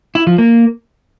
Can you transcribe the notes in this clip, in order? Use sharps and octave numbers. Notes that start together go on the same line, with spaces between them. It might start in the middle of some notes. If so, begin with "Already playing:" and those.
E4
F3
A#3